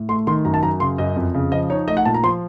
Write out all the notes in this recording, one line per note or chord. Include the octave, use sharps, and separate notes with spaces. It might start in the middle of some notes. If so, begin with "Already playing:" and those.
Already playing: A2
A3 C6
D#3 C6
F#2 A#5
A5
F#2 A#5
C#3 C6
F#2 D#5
F2
C#3
F3 D#5
D#4 C#5
A3 D#5
F#5
A#2 A5
A#5
F3 C6